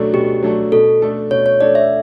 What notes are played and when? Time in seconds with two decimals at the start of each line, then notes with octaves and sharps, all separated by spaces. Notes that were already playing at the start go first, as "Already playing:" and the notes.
Already playing: B2 F#3 A3 D4 A4
0.13 B2 G4
0.43 F#3 A3 D4 A4
0.72 B2 A4
1.02 A3 D4 A4
1.31 B2 C#5
1.46 C#5
1.61 A3 D4 A4 D5
1.75 E5